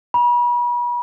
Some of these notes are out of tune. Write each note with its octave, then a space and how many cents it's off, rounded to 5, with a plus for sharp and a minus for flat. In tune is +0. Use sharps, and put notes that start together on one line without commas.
B5 -40